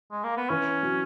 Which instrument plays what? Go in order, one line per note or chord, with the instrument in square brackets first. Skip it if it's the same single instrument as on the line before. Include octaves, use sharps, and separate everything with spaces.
[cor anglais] G#3
A#3
B3
[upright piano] E3 [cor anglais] C#4
[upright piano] F#3